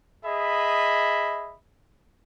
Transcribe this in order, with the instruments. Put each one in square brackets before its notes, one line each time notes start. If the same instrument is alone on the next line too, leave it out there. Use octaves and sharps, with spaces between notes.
[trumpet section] G#4 D#5 E5 B5